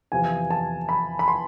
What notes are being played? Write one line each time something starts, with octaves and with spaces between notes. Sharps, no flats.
E2 C3 F3 G#5
A5
B5
B5
C6